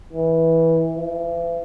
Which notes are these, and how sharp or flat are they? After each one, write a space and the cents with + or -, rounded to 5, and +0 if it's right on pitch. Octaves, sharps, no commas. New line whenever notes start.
E3 -15
E3 +45